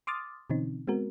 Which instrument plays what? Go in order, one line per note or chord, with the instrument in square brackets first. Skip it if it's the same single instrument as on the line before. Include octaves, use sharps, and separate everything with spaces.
[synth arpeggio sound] C6 D6 D#6 F6 A6
B2 D3 E3 C4 C#4 D#4
G#3 B3 C4 F#4 A#4